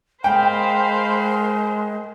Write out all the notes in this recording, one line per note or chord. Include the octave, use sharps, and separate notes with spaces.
G#3 A#4 C5 F5 G5 B5